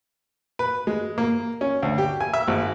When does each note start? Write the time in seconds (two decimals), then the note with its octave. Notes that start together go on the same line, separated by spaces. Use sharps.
0.59 B4
0.87 G#3
1.18 A#3
1.61 C#4
1.82 D2
1.98 G4
2.20 G#5
2.33 E5
2.48 G#1